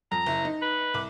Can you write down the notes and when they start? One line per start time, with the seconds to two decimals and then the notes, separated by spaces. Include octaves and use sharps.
0.12 F2 A#5
0.26 F#1 E4
0.45 D#4
0.62 B4
0.94 C2 D6